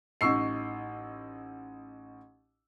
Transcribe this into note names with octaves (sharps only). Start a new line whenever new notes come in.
A1 D#4 C#6 E6 C7